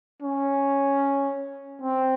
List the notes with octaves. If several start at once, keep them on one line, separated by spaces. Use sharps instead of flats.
C#4
C4